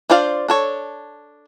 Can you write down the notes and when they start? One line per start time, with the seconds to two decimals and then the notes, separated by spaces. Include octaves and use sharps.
0.10 D4 F4 C5 D5 F5
0.48 D4 A4 C#5